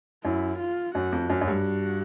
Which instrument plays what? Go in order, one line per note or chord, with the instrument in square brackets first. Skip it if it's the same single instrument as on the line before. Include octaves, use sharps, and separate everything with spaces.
[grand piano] F#2 [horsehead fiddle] E4
[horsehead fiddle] F4
[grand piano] F#2 [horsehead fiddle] F#4
[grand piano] F2
[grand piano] F#2 [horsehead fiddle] F#4
[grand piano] F#2
G2